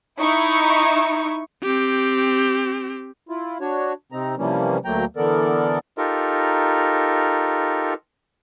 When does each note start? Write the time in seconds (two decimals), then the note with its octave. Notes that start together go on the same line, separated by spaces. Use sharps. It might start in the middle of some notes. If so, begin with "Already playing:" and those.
0.19 D#4 E4 C#6
1.63 C4 G4
3.29 E4 F4
3.61 D4 F#4 C#5
4.12 C3 C4 D#4 A#5
4.38 C3 E3 F3 G3 A#3 C#4
4.85 D2 F#3 A3 A#3 G5 A#5
5.17 D3 E3 B3 A4 A#4 D5
5.98 D#4 F4 G4 A4 A#4